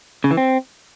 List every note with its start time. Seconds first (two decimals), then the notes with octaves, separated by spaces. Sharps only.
0.24 C#3
0.31 E3
0.37 C4